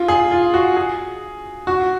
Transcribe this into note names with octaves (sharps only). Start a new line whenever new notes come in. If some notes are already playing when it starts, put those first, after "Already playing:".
Already playing: F4
G#4
F4
F#4
G#4
F#4